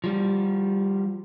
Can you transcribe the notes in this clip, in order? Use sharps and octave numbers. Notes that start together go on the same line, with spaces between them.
F3 G3